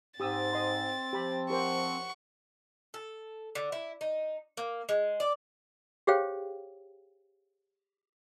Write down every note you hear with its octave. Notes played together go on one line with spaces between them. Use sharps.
G#2 C4 G4 D#6 E6 A6
D#5 C6
F3 G4 B5
G4 A#4 C5 F#5 C#6
A4
D3
E4
D#4
A#3
G#3
D5
G4 G#4 C5 C#5 F5 G5